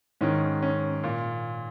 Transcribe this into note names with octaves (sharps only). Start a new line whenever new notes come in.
G#2 D#3 C#4
C#4
A#2